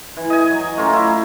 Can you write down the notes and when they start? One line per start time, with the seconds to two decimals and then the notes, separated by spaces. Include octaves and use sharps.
0.17 E3
0.30 D#5 G#5
0.51 F#3
0.77 A3 C#4 F4 A#4
0.93 E4 F5